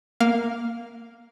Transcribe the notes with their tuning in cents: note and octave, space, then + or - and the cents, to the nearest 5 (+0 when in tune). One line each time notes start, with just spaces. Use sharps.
A#3 +0 F5 +0